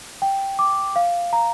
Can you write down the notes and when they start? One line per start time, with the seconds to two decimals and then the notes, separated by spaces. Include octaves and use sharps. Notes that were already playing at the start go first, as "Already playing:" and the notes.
0.22 G5
0.59 D6
0.96 F5
1.33 A#5